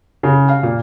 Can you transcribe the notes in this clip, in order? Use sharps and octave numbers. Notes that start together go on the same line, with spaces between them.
C#3
F5
A#2